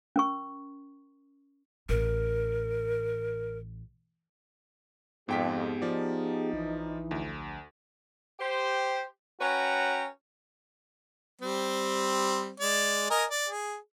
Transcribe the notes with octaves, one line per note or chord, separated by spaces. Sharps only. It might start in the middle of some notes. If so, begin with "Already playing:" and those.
C#4 A#4 C#6
A1 A#4
F2 G#2 B3 G4 G#4 G5 B6
F3 D#4 D5
A#1 E3 E4
D2
G4 C5
C#4 F#4 B4 C#5 G5 A#5
G3 C4
G#3 D5
A#4 D#5 G#5
D5
G#4